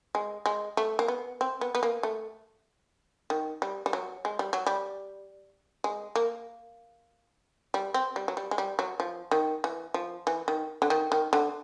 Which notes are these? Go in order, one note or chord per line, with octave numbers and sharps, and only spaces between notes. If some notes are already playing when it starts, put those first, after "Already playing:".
G#3
G#3
A3
A#3
B3
C4
B3
B3
A#3
A3
D#3
G3
G3
F#3
G#3
G3
F#3
G3
G#3
A#3
G3
C4
G3
F#3
G3
G#3
G3
F#3
F3
D#3
E3
F3
E3
D#3
D3
D#3
D#3
D3